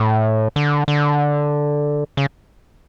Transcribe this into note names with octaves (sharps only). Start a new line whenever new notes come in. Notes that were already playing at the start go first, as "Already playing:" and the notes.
Already playing: A2
D3
D3
C#3